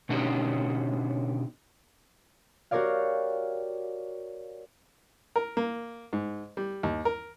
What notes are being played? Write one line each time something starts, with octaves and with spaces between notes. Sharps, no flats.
B2 D3 C#4 D#4 F#4 G4
F#4 G4 A#4 C#5 D5 F5
A#4
A#3
G#2
G3
D#2
A#4